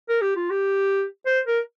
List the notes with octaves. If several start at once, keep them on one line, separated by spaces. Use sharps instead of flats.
A#4
G4
F4
G4
C5
A#4